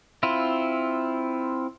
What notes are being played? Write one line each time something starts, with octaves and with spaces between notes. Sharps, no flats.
C4 E4 F4